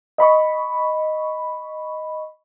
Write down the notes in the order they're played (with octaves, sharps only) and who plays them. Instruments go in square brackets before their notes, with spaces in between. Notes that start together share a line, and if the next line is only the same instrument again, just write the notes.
[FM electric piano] D#5 B5 C#6